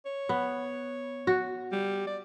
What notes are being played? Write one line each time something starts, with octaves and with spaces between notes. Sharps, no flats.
C#5
B3
F#4
G3
D5